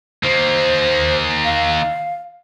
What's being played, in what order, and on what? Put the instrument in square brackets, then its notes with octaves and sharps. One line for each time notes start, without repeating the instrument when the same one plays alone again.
[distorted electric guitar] D#3 A#3 [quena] C5
[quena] F5